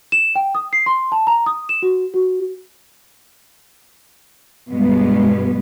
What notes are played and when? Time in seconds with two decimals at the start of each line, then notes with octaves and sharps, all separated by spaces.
0.12 E7
0.35 G5
0.55 D#6
0.73 C7
0.86 C6
1.12 A5
1.27 A#5
1.46 D#6
1.69 E7
1.82 F#4
2.14 F#4
4.69 G2 B2 G#3 B3